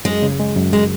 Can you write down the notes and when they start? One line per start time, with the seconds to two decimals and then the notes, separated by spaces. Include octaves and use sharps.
0.05 F#2 G#3
0.22 C#3
0.40 G#3
0.56 F#2
0.73 G#3